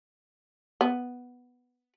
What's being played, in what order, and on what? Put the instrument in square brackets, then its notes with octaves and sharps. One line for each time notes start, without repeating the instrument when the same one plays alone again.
[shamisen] B3